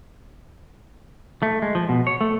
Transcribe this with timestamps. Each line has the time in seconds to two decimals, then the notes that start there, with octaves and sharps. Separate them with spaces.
1.43 A3
1.62 G#3
1.75 F3
1.89 B2
2.07 C#5
2.21 A3